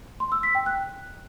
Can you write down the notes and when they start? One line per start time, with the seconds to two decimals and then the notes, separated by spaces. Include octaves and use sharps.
0.20 C6
0.32 E6
0.43 B6
0.55 G5
0.66 F#6